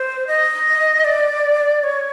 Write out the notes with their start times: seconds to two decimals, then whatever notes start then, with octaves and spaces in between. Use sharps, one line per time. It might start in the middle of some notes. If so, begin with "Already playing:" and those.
Already playing: C5
0.27 D#5
1.04 D5
1.84 C#5